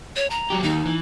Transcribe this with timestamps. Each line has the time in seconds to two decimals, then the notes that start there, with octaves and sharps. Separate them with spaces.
0.16 C#5
0.30 A#5
0.50 F#3 G4
0.63 D#2 D#4
0.86 E3